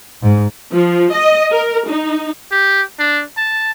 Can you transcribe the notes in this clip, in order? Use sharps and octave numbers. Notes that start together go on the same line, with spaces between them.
G#2
F3
D#5
A#4
D#4
G4
D4
A5